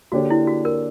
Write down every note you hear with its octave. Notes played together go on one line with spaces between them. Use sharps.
D3 A#3 D4 F#4 G4 C#5
E4
F#4
A#4